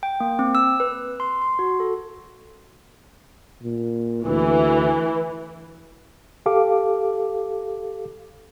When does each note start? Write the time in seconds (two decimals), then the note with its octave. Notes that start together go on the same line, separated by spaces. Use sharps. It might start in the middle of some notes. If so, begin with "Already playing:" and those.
0.03 G5
0.20 A#3
0.39 C4
0.55 E6
0.80 B4
1.20 C6
1.42 C6
1.59 F#4
1.80 A4
3.63 A#2
4.26 D2 E3
6.46 G4 A4 F5 D6